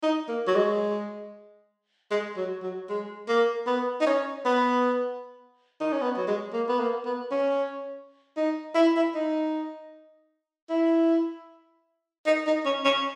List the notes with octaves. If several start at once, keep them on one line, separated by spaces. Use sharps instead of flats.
D#4
A#3
F#3
G#3
G#3
F#3
F#3
G#3
A#3
B3
D#4
C#4
B3
D#4
C#4
B3
F#3
G#3
A#3
B3
A#3
B3
C#4
D#4
E4
E4
D#4
E4
D#4
D#4
C#4
C#4